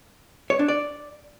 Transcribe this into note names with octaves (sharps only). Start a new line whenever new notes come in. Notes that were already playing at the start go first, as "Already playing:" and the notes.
C#5
D4
D5